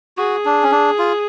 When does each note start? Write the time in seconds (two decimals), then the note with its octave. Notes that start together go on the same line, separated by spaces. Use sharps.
0.18 F#4 G#4
0.45 D4
0.63 C#4
0.72 D4
0.99 F4